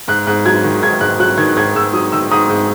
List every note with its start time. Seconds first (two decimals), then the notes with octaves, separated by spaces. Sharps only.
0.08 G#2 F#6
0.27 G#2 F#6
0.46 F#3 G#6
0.64 D#3
0.83 G#2 G#6
1.01 G#2 F#6
1.20 F#3 F#6
1.38 D#3 G#6
1.57 G#2 G#6
1.76 G#2 E6
1.93 F#3 D#6
2.12 D#3 E6
2.31 G#2 D#6
2.49 G#2